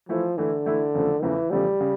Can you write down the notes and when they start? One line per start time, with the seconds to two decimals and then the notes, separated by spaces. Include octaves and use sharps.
0.09 E3 F3 A3 E4
0.37 D3 E3 A3 E4
0.65 E3 A3 E4
0.94 E2 C#3 F3 A3
1.22 E2 C#3 E3 F3 A3
1.51 E2 C#3 F3 G3 A3
1.80 C#3